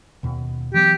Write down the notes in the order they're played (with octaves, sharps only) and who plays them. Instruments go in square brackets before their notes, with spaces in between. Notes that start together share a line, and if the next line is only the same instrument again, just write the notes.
[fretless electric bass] D#2 B2
[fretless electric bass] E3 F#3 B3 [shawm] G4